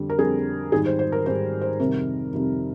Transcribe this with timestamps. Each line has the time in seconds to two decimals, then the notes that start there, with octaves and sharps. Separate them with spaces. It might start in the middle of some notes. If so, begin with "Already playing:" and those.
Already playing: F2 D3 G3
0.10 A#4
0.18 F2 D3 G3 G#4
0.72 G#2 D#3 G3 G#4
0.86 C5
0.99 C5
1.12 A#4
1.26 G#2 D#3 G3 C5
1.61 C5
1.79 F2 C3 D#3 G3 A#4
2.33 F2 C3 D#3 G3